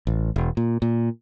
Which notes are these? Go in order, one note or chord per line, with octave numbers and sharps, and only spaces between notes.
A1
E1
A#2
A#2